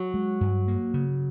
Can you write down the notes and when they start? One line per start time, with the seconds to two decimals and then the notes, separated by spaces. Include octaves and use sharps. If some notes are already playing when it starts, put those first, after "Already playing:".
Already playing: F#3
0.14 G#3
0.41 G2
0.68 A#3
0.94 C#3